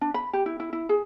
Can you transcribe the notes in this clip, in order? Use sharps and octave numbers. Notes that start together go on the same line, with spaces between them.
D4
B5
G4
E4
E4
E4
G#4